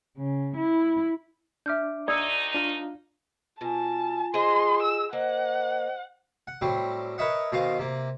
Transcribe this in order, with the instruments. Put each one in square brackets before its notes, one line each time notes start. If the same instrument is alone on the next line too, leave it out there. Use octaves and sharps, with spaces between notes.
[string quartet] C#3
E4
[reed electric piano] D4 D6 [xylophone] E5 F6 G6
[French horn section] D2 D#4 [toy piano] D5 [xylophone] D#6 E6 C#7
[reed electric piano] D4 F4 F5
[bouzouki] B2 [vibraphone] F4 G#5 [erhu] A5
[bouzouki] G#4 C5 D#5 [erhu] C6
[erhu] E6
[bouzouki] A#3 [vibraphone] C5 D#5 [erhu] F#5
[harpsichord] F#5
A2 F#3 G3 C4
A#4 B4 C#5 D#5 E5 F#5
B2 D#3 C4 D#5 F5
C3 A#3